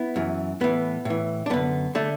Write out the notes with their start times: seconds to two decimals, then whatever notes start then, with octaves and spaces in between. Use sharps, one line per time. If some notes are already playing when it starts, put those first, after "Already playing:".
Already playing: B3 E4
0.16 F#2 E3
0.61 A2 E3 B3
1.05 A2 E3
1.46 D4
1.50 F#2 D3 B3
1.95 D3 A3